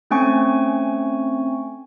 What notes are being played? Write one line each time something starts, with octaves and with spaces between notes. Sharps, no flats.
A3 C4 C#4 G5 G#5 C#6